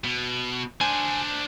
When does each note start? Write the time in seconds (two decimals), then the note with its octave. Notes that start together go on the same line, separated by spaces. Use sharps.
0.04 B2
0.81 D4 C5 G#5